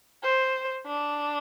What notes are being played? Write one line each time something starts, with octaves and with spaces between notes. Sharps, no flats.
C5
D4